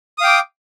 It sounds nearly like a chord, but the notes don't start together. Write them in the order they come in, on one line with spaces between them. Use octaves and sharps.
D#6 F5 G5 D6